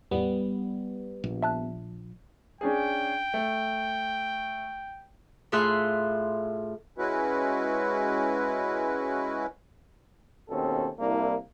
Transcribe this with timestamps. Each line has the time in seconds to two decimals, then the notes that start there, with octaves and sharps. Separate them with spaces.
0.11 E2 A2 G3 B3
1.24 A#1
1.43 E5 A5 F#6
2.61 C#4 D4 G#4 G5
3.34 A3
5.52 A2 F4 G#4 E5 C6 F#6
6.98 G#3 C#4 E4 F#4 B4
10.49 D#2 B2 C4 C#4 A4
10.99 C2 A#3 D4 E4